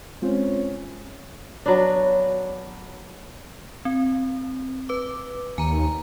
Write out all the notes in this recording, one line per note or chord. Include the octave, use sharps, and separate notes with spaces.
G#3 C4 C#4 F4 C5
F#3 B3 D4
C4
B4 D6
D#2 G#5 A#5